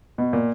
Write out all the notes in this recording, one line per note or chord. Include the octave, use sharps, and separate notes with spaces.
B2
A#2